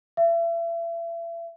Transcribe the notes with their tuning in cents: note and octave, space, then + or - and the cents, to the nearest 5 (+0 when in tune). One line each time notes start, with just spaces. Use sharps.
E5 +35